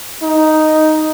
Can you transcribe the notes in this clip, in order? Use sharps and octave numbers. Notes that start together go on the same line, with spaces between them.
D#4